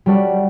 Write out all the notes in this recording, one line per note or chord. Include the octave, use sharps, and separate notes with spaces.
G3 C#4 F#4 A4 D5